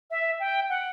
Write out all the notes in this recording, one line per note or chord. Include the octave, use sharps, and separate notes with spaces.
E5
G5
F#5